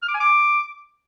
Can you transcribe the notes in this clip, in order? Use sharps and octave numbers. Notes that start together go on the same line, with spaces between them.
F6
D6
G#5
D6